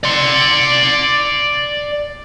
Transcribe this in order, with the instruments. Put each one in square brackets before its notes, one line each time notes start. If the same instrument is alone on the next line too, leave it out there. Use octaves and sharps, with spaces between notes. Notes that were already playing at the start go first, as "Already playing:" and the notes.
[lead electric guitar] D5 C6